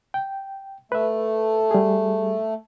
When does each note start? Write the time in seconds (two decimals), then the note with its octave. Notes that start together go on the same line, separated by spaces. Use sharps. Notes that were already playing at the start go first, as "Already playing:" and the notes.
0.14 G5
0.92 A3 B4 E5
1.71 G3 G#4